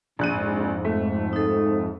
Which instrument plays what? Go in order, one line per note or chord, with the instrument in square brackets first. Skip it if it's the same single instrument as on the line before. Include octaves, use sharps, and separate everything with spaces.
[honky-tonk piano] A#1 F#6 D#7 [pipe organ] F2 G#2
[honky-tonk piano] A3
[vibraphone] D#4 A4